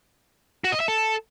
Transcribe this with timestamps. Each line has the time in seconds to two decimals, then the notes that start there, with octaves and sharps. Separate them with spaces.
0.64 F#4
0.72 D#5
0.80 E5
0.88 A4